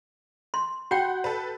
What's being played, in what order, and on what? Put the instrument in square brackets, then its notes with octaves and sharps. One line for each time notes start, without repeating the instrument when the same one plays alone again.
[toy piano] C6
[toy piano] F#4 G5 [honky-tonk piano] F#5 B5 G6
[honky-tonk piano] A4 B4